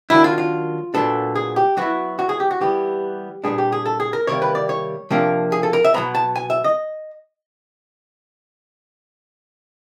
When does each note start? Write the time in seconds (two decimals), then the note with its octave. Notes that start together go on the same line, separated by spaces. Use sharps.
0.10 D#3 F#3 A#3 D4 E4
0.24 F4
0.38 F4
0.94 A#2 F#3 B3 D4 A4
1.35 G#4
1.56 G4
1.77 F#3 B3 E4 F#4
2.19 F#4
2.29 G#4
2.40 G4
2.51 F#4
2.61 E3 G3 B3 G4
3.44 A#2 G3 B3 D4 G#4
3.58 G4
3.72 G#4
3.86 A4
4.00 G#4
4.13 A#4
4.27 C3 D#3 G3 A#3 C#5
4.42 B4
4.55 D5
4.69 C#5
5.10 C3 F3 A#3 D4
5.52 G#4
5.63 A4
5.73 A#4
5.84 E5
5.94 B2 F#3 B3 A#5
6.15 A5
6.36 G#5
6.50 E5
6.64 D#5